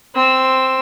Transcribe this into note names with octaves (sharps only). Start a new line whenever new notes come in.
C4 E6